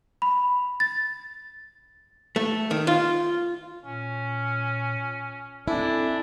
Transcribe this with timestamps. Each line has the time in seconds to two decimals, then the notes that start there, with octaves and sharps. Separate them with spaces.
0.22 B5
0.80 A6
2.36 A3
2.71 D#3
2.87 F4
3.85 A#2 C#4
5.68 C4 D4 E4 A4 G#5